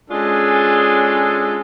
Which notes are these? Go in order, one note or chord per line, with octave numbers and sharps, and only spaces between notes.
G#3 C#4 D4 F4 G#4 A4